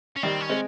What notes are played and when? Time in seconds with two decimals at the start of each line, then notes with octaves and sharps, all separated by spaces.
0.17 C#4
0.23 D#3 G3 C4
0.41 C#4
0.49 G#3 C4